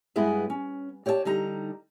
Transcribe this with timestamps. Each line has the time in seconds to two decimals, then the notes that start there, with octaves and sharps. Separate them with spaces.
0.16 G2 G#3 B3 E4 G#4 G#5
0.50 C#4
1.06 G4 C#5 D5 E5 A5
1.25 D3 G3 D#4 A#5